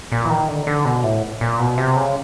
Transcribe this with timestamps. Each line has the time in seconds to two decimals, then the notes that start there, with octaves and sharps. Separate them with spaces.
0.12 A#2
0.25 E3
0.30 D#3
0.48 D3
0.67 D3
0.85 B2
1.03 A2
1.41 A#2
1.60 B2
1.78 C3
1.96 C#3